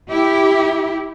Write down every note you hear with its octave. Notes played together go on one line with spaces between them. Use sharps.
E4 G4